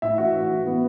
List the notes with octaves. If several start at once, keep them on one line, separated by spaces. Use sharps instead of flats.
A2 E5
E3 F#4
A2
E3
B3